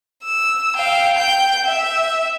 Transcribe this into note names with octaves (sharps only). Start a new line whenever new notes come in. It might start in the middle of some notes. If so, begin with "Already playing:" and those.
E6
F5 G5
G5 G6
E5